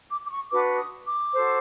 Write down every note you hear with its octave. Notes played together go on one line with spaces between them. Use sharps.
D6
D6
C#6
D4 F#4 B4 D6
D#6
D6
F#4 A4 C5